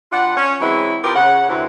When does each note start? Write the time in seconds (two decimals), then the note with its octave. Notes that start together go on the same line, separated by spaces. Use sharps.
0.12 G2 D4 F4 F#5
0.36 C#4
0.60 E3 F#3 G#3 B3 C4 E4
1.03 C3 B3 F4 G4 A#4
1.15 C#3 F#5
1.48 D2 C3 E3